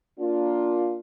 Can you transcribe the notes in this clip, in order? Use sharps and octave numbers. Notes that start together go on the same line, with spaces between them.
A#3 D4 F4